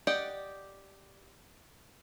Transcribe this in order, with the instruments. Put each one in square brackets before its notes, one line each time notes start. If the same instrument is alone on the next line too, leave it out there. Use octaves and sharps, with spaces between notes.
[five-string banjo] G4 D5 D#5 F#5